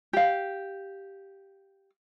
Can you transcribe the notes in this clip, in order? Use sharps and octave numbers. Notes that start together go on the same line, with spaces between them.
G4 F5